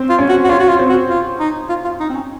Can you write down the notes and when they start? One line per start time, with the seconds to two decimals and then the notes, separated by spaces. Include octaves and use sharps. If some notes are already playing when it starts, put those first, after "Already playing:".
Already playing: C4 C5
0.09 F4
0.19 C#4 C#5
0.29 F#4
0.44 F#4
0.49 C#4 F4 C#5
0.59 F#4
0.69 F4
0.79 C4 C5
0.89 F#4
1.10 F4
1.40 D#4
1.69 F4
1.84 F4
2.00 D#4
2.09 C4
2.15 C#4